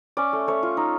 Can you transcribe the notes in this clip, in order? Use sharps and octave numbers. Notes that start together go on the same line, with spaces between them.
C#4 D5
A3
A3 C#5
F4
D#4